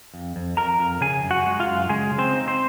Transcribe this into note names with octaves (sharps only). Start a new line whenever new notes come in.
F2
F2
F2 A#4 A#5
F2
C#3 G#4 G#5
F#2
F#4 F#5
G#3
F4 F5
F#2
C#3 G#3 G#4
C#3
C4 C5
D#4
C4 C5